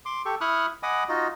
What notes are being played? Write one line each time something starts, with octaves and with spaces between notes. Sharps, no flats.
C6 D6
G4 A4 C#6
E4 B5 C#6 D#6 F6 F#6
D#5 F#5 G#5 B5 D6 D#6
D#4 F4 F#4 D#5